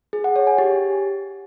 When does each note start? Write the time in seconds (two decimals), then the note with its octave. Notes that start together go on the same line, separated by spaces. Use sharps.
0.13 G#4
0.24 F#5
0.36 C#5
0.47 G#5
0.58 G4